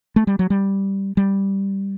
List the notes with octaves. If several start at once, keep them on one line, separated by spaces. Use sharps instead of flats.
A3
G3
F#3
G3
G3